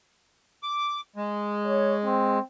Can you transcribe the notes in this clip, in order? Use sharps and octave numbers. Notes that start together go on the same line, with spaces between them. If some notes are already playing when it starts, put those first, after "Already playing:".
D6
G#3
C#5
C4